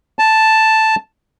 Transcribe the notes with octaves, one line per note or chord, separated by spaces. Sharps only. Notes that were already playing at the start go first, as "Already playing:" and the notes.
A5